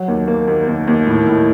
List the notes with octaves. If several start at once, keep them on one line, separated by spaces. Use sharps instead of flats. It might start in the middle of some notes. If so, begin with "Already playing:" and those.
Already playing: F#3
D#2
A#3
D#2
D#2
D#2
A2
A2